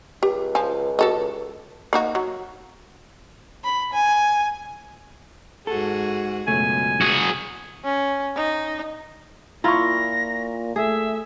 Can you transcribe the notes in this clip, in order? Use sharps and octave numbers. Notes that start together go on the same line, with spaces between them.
C#2 G4
F3 G#5
F#4 A4 D#5
A#3 D#4 F#4
F#3
B5
G#5
G#2 F#4 G#4 A4
C#2 F#2 B2 A3 G#5
F#4 G#4
C#4
D#4
A#2 E4 F4 A#5 C#6 A#6
A3 G#4 E5